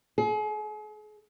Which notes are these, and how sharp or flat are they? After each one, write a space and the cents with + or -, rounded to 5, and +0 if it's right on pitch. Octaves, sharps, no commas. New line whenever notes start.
G#4 +40